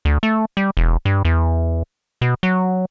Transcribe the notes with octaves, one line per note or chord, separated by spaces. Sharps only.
D2
A3
G3
E1
G2
E2
B2
F#3